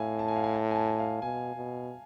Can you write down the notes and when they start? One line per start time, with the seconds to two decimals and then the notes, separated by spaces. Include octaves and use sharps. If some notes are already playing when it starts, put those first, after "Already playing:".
Already playing: A2 E5 F5 G#5
0.19 A5
0.28 G#5
0.36 F5
0.44 G#5
0.54 A5
0.71 G#5
0.76 A5
0.99 F5
1.22 B2 G#5
1.56 B2